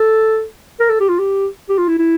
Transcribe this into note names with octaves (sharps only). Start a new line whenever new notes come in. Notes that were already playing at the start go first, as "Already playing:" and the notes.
Already playing: A4
A#4
A4
G4
F4
G4
G4
F4
E4
E4